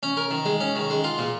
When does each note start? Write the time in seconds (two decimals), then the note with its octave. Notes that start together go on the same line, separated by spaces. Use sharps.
0.03 C#4
0.17 A#4
0.31 D#3
0.45 G#3
0.60 C#4
0.76 D#3
0.90 G#3
1.04 F4
1.18 A#2